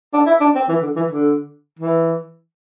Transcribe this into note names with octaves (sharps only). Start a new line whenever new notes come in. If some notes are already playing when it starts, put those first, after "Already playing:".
D4
E4
D4
C4
E3
D3
E3
D3
E3